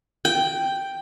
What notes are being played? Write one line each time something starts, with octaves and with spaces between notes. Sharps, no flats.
G5